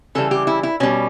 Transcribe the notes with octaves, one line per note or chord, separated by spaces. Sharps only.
C#3 E3 G3 A4
G4
E4
E4
B2 G3 C#4